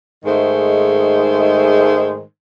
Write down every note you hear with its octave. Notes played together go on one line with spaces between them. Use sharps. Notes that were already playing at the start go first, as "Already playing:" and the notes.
G#2 D#3 G#3 A3 C5